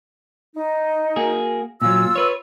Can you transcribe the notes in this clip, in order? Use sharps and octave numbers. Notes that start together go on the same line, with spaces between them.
D#4
A#3 F#4 G#4
A#2 F#3 F4 E6
B4 C#5